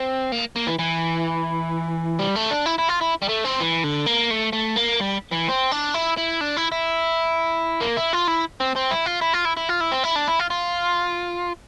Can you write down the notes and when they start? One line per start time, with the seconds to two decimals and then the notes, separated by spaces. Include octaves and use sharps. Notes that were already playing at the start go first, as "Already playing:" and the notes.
Already playing: C4
0.32 A#3
0.56 A#3
0.67 E3
0.79 E3
2.19 G3
2.35 A3
2.51 D4
2.66 E4
2.79 E4
2.89 F4
3.01 E4
3.22 G3
3.29 A3
3.45 C4
3.60 E3
3.84 D3
4.06 A#3
4.31 A3
4.53 A3
4.77 A#3
5.01 G3
5.31 E3
5.48 C4
5.71 D4
5.94 E4
6.17 E4
6.41 D4
6.57 E4
6.72 E4
7.81 A#3
7.97 E4
8.13 F4
8.28 E4
8.60 C4
8.76 C4
8.91 E4
9.06 F4
9.21 E4
9.34 F4
9.45 E4
9.57 E4
9.69 F4
9.81 E4
9.92 C4
10.04 E4
10.16 D4
10.28 E4
10.40 F4
10.50 F4